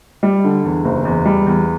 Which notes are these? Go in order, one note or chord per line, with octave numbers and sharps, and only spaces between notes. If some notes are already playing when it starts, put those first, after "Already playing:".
G3
D3
E2
F#1
E2
G3
E2